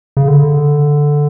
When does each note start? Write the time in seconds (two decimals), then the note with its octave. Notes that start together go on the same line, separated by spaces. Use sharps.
0.17 C#3
0.28 D3